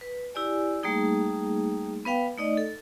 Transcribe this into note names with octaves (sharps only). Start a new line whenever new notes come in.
B4
E4 G4 D5 G#5
G3 A3 A#3 D#4 G#4
B3 B4 F5 G5
A3 D#4 D5 D#5
A4